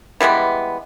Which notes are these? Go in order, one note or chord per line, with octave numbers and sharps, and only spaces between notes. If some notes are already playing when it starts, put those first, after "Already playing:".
E3 G3 G#3 B3